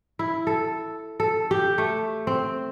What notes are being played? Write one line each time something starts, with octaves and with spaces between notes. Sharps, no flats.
E4
A4
A4
G4
A3
C4